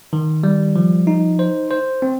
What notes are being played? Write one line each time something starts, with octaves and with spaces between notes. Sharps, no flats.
D#3
G3
F3
D#4
C5
C5
C4